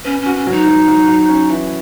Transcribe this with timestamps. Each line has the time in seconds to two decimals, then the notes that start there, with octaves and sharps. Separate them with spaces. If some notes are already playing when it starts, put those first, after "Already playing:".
0.04 B3 C#4
0.20 C#4
0.26 F#4
0.36 C#4
0.47 F#3 D#4
0.67 F#3
0.88 F#3
1.08 F#3
1.29 C#4
1.50 E3